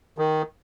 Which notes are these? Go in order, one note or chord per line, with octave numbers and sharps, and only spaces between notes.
D#3